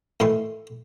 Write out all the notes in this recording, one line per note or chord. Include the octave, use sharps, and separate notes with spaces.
A2 D#3 E3 C6